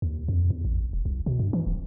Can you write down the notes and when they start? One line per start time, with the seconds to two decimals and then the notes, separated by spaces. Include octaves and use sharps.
0.02 D#2
0.28 F2
0.50 E2
0.65 A1
0.93 D#1
1.05 C2
1.26 B2
1.39 G2
1.53 E3
1.67 D1